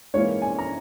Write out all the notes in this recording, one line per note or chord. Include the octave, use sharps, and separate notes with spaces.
G#2 E3 A#3 C#5
G#5
A#5